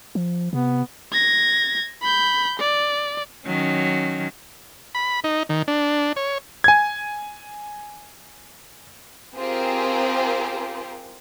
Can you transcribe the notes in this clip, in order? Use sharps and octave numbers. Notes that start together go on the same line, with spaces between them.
F3
C3 B3
G#6 A#6
B5 G6
D5
D#3 F#3 C#4
B5
D#4
D#3
D4
C#5
G#5 G#6
C4 F4 G4 G#4 A#4 C5